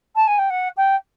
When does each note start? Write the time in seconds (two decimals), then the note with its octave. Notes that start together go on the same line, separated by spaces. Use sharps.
0.15 A5
0.27 G#5
0.38 G5
0.50 F#5
0.77 G5